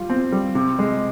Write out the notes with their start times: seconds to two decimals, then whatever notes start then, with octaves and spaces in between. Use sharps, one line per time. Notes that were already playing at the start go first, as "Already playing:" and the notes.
Already playing: G3 F4
0.10 C4
0.32 G3
0.55 C3
0.79 G#3